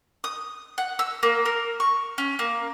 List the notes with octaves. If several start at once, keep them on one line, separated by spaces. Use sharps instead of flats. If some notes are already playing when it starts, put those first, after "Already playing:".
D#6
F#5
E6
A#3
A#4
C#6
C#4
A#3